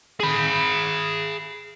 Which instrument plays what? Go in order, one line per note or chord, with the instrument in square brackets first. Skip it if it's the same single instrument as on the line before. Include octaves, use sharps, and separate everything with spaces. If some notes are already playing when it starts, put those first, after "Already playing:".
[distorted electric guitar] G#4 B5